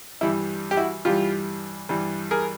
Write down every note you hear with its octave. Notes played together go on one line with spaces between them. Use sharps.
G2 E3 G3 E4
G4
E4 F#4
G2 E3 G3 F4 G4
G2 E3 G3
G#4 A#4